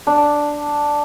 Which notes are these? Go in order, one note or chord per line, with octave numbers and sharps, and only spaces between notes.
D4